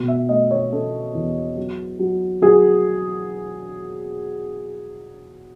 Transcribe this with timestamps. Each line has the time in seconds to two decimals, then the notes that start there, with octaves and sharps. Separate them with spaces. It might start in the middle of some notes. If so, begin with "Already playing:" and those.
Already playing: B2
0.08 E5
0.29 A3 D#5
0.51 C#5
0.72 C#4 A4
1.14 E2
1.57 F#3
1.99 F#3
2.42 F#3 G#4